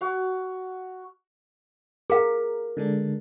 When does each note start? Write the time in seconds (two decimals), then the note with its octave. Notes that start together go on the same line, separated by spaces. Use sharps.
0.01 F#4 F5
2.10 G#4 A#4 F5
2.77 D3 G#3 D4